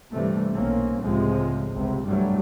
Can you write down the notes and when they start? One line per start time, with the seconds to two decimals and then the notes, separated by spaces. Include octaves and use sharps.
0.13 G2 C3 E3 G3 A3
0.54 B1 A#3 C4 C#4
1.03 C#2 A2 C3 F3 G#3
1.72 G1 C#2 C3
2.06 C2 G2 F#3 G3 A3